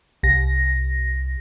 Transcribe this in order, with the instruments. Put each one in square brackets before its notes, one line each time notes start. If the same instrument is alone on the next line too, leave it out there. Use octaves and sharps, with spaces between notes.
[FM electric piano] C2 A#6